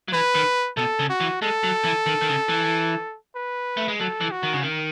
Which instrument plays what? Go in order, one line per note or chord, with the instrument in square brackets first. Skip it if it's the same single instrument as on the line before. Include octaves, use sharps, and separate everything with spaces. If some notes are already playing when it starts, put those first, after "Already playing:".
[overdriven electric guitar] F#3
[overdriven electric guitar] E3 [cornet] B4
[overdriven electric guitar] D#3
[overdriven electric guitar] B2 [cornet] A4
[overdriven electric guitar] C#3
[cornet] F#4
[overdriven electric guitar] E3
[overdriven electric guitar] G#3 [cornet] A4
[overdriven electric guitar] F#3
E3
D#3
D#3
C#3
E3
[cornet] B4
[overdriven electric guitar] A3
G#3
[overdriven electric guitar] F#3 [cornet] A4
[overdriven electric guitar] E3
[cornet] F#4
[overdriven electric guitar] D#3
C#3
D#3